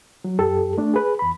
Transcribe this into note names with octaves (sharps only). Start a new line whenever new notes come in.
F#3
F#2 G4 A4
A3 D4
G#4 B4
E2 B5